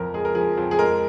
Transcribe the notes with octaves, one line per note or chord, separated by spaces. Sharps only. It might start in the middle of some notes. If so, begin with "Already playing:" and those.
Already playing: F2 F3 A#4
G#3 G#4
A#4
F3 G#4
F2
G#4
G#3 A#4